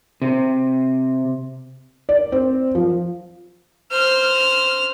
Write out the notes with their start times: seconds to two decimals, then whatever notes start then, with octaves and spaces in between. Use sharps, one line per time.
0.22 C3
2.09 D5
2.32 C4
2.75 F3
3.91 C5 F6